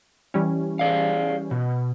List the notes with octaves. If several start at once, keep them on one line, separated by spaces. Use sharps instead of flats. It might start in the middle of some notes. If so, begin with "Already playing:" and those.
E3 G3 C#4
G#4 D5 F5
B2